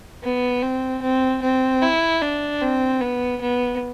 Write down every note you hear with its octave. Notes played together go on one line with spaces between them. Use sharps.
B3
C4
C4
C4
E4
D4
C4
B3
B3